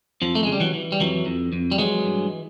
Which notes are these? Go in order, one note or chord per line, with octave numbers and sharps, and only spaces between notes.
F2 F3
A3
G#3
C#3
G3
E3 F#3
E3
G3
F2 E3 F#3
F2
F2
G3
E3 F#3 G#3
G2